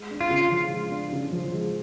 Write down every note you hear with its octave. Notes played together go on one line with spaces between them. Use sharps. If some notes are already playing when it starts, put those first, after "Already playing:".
Already playing: G#3
D4
F4
C#3
F3
G#3
D4
C#3
F3
G#3